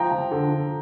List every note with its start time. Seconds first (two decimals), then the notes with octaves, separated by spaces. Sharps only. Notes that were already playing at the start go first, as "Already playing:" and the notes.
Already playing: F3 G5 A#5
0.11 F3
0.31 D3
0.51 D3